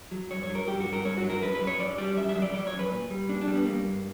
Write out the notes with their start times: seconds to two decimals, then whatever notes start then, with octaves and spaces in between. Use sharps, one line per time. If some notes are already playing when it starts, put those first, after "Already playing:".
0.11 F#3
0.30 G2 C#5
0.43 C#5
0.49 F#3
0.55 A#4
0.67 G2 G4
0.80 F#4
0.86 G2
0.93 A#4
1.05 G2 C#5
1.17 F#4
1.23 F#3
1.30 A#4
1.42 F#2 B4
1.55 B4
1.61 F#2
1.67 C#5
1.80 F#2 D5
1.98 G3 D5
2.17 F#2 E5
2.29 E5
2.35 F#3
2.42 D5
2.54 F#3 D5
2.67 C#5
2.73 F#2
2.79 B4
2.92 A#2
3.11 G3
3.29 A#2 D4
3.42 D4
3.48 G3
3.54 B3
3.66 G3 A#3
3.85 G2